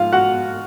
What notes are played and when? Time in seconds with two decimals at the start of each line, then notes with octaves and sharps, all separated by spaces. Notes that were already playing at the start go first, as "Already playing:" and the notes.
Already playing: G#2 F3 F4 F5
0.12 F#4 F#5